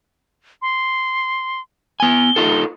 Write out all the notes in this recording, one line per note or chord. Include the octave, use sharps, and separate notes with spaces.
C6
B3 G#5 G7
D#4 F4 A4